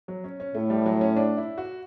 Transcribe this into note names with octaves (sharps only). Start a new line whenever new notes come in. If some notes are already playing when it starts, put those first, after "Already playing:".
F#3
C#4
C#4
A2 A3
G3
F#3
C#4
D4
E4
F#4